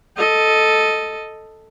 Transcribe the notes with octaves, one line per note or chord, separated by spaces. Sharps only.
A4 D#5